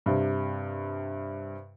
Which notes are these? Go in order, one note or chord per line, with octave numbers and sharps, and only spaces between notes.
G2 C3